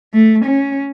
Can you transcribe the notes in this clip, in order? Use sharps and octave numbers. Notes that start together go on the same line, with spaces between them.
A3
C#4